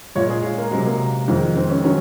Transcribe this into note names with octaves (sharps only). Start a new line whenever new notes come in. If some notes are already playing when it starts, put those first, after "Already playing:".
A#2 G#3 C#5
G#4
F4
A#3
C3 F#3 G#3
A#3
F2 D#3 G#3
C4
C#4
D#3 F#3 C#4